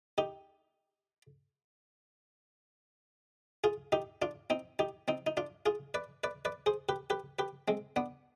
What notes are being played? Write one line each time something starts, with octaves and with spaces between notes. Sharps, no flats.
D#4 G4
F4 G#4
D#4 G4
D4 F4
C4 D#4
D#4 G4
C4 D#4
D#4
D4 F4
F4 G#4
B4 D5
B4 D5
B4 D5
G#4 C5
G4 B4
G4 B4
G4 B4
G#3 C4
B3 D4